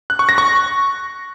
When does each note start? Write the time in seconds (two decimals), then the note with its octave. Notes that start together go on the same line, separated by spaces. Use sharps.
0.10 F#6
0.19 C#6
0.29 A#6
0.38 C#6